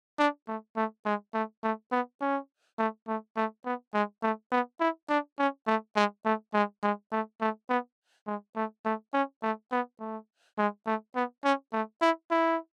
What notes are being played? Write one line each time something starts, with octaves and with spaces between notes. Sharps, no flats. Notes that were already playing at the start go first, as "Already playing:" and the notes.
D4
A3
A3
G#3
A3
A3
B3
C#4
A3
A3
A3
B3
G#3
A3
B3
E4
D4
C#4
A3
G#3
A3
G#3
G#3
A3
A3
B3
G#3
A3
A3
C#4
A3
B3
A3
G#3
A3
B3
C#4
A3
E4
E4